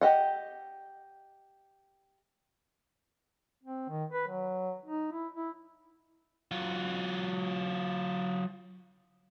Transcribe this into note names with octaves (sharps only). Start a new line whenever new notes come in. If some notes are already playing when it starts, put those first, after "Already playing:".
G4 D#5 F#5
C4
D#3
B4
F#3
D#4
E4
E4
F#3 F4